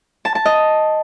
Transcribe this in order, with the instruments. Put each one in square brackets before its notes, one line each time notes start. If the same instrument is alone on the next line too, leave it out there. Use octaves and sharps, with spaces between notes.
[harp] A5
A5
D#5